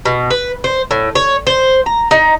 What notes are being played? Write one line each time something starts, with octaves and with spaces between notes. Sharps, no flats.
B2
B4
C5
A2
C#5
C5
A#5
D#4